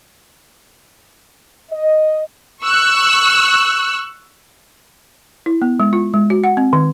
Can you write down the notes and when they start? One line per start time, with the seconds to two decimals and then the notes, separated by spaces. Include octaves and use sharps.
1.71 D#5
2.63 C#6 E6 F#6
5.46 E4
5.62 B3
5.80 G#3
5.93 F4
6.14 G#3
6.30 F#4
6.44 F#5
6.57 C4
6.73 D#3